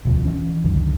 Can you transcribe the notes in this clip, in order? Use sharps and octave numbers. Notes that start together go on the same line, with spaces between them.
E1 D2 F3
E3 C#4
C#2 F#2 D3 D#3